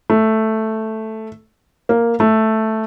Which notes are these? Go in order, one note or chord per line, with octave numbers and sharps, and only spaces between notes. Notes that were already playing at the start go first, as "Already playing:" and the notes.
A3
A#3
A3